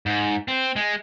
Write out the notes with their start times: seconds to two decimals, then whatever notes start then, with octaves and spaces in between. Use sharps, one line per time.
0.06 G#2
0.48 C4
0.76 G#3